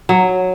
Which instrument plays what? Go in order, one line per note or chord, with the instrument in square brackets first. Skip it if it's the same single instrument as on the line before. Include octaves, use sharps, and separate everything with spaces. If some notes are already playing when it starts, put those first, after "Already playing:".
[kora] F#3